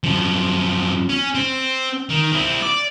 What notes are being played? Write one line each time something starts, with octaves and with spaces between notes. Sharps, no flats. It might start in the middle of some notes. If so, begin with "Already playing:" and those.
F#2 F3
C#4
C4
D#3
C4 E4
D5